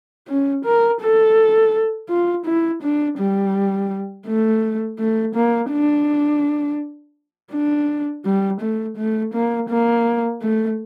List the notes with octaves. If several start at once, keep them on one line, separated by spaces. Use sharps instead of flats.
C#4
A#4
A4
F4
E4
D4
G3
A3
A3
A#3
D4
D4
G3
A3
A3
A#3
A#3
A3